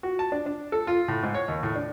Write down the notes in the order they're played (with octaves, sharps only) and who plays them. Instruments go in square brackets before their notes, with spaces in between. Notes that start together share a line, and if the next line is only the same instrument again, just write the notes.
[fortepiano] F#4
A5
D4
D4
A4
F4
A2
G#2
C#5
D#2
A2
D4